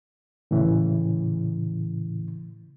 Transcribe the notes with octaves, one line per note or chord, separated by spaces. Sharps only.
A2 C#3 E3